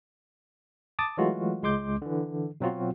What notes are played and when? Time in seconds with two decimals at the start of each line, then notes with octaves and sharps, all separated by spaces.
0.99 A5 D6 D#6 A6
1.17 E3 F#3 G#3 A3 F4 F#4
1.63 C#2 G#3 C6 D6 G6
2.02 D3 E3
2.60 B2 F#3 C4 F4 F#4